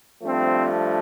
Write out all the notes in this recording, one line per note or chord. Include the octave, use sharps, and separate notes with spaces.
G2 F3 A3 C4